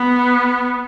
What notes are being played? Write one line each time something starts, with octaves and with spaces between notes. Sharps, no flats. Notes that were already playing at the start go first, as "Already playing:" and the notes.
Already playing: B3